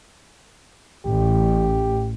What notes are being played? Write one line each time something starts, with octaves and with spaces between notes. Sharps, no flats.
A1 G4